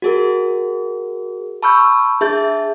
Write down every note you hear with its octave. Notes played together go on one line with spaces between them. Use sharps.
F#4 G#4 A#4
A5 B5 C#6 E6 F6 G6
D4 G#4 E5 A5 G6 A6